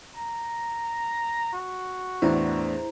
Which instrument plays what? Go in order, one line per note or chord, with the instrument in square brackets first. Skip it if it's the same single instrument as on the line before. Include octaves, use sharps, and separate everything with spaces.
[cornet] A#5
F#4
[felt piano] E2 A2 D4 [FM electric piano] E4 C5 A#5